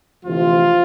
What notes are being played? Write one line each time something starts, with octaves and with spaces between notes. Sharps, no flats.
D2 C3 E3 F3 F4